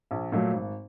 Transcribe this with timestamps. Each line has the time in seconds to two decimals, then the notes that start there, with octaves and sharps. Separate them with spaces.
0.11 A#1
0.32 A#2 F#3 A3
0.53 G#1